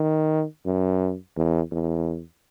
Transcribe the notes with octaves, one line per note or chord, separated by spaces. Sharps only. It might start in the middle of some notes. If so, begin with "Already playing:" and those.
Already playing: D#3
F#2
E2
E2